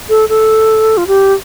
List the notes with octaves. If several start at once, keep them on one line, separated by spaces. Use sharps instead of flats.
A4
A4
F4
G4